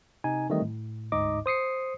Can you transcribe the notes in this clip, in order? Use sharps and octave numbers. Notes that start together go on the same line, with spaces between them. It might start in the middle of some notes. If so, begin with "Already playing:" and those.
C3 D#4 G#5
D#3 E3 G3 A3 C4 D#5
A2
G1 D2 G#2 D#4 D#5 D6
C5 D#6 C7 C#7